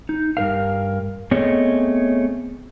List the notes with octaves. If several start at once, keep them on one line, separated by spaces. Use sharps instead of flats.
D#4
G2 A#4 F5
A3 B3 C4 G#4 C#5 D#5